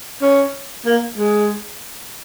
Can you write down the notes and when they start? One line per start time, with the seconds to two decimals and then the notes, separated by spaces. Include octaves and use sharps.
0.22 C#4
0.86 A#3
1.18 G#3